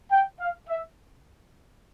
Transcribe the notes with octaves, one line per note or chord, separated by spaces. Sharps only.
G5
F5
E5